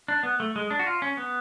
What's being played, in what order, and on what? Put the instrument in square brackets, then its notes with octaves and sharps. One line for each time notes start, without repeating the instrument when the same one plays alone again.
[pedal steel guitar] D4
B3
A3
G#3
D4
F#4
F4
C#4
B3